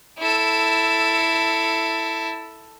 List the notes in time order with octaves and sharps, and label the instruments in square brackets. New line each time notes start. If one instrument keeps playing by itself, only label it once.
[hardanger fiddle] E4 A4